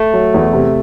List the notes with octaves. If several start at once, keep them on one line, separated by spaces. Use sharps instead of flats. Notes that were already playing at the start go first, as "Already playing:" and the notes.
Already playing: A3
F#3
E2
C3